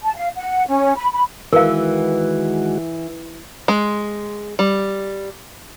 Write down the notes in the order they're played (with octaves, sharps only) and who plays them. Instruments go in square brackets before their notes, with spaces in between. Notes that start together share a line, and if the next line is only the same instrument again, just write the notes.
[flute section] A5
F5
F#5
C#4
B5
B5
[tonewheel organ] D#3 G#3 F#4 [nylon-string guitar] E3 [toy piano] A#4 F5
[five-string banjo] G#3
G3